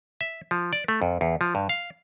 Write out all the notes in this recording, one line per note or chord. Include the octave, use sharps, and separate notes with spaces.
E5
F3
D5
A3
F2
E2
F3
G2
F5